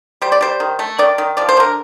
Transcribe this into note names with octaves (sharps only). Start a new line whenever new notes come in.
G3 C5
D5
G3 C5
D#3
A3
D#3 D5
D#3
F3 D5
C5
D3 A#4